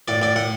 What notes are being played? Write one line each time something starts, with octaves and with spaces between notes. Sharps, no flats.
A2 D5
A2 D5
A2 F#5